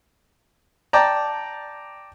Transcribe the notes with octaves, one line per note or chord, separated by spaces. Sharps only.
D5 G5 A5 A#5